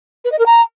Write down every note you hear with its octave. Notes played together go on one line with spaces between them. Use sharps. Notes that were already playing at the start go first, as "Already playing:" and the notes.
B4
D#5
A#4
A#5